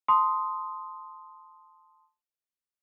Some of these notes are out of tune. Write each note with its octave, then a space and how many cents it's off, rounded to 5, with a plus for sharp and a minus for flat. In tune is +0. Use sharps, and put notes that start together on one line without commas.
A5 +0 C6 -5 D#6 +0